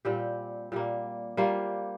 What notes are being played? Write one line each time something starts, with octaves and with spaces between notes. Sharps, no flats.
A#2 G3 C4 G4
A#2 G3 A#3
G3 A#3 F4 C5